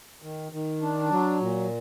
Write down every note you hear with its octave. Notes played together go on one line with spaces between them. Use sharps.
D#3
D#3
D4
F#3
A#2